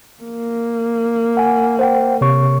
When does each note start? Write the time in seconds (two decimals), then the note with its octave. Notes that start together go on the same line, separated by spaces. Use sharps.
0.23 A#3
1.37 F#5 G#5
1.79 C5 F#5 G5
2.21 C3 C#5 C#6